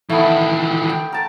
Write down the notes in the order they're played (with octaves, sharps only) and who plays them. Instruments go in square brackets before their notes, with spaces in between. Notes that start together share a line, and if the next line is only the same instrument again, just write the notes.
[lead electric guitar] D#3 E3 [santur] A3 B3
[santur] G5
A#4 A5